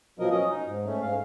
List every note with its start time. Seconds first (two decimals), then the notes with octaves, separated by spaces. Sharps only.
0.19 B2 F3 F#3 A#4 D#5
0.31 C#4 D#5
0.50 D#4
0.66 G#2
0.86 A3 C#4
1.01 G#2 F5